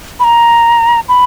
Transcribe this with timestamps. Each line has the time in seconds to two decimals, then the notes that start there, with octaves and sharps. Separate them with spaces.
0.20 B5
0.24 A#5
1.09 B5